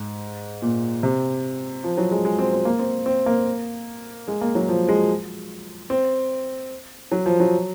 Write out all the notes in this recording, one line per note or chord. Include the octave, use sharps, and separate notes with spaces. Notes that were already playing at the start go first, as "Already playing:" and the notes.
Already playing: G#2
A#2
C3
F3
F#3
G#3
G#3
C4
C4
A#3
C4
C4
A#3
G#3
A#3
F#3
F3
G#3
C4
F#3
F3
F#3